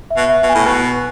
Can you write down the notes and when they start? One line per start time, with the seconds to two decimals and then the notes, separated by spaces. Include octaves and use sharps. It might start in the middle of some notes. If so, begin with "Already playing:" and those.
0.10 E5
0.17 B2
0.29 E5
0.43 B2
0.49 G#5
0.54 A2
0.66 B2